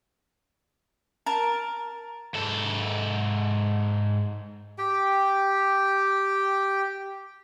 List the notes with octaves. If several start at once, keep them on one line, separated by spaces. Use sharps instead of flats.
A#4 A5 A#5
G#2 A4
G4 G5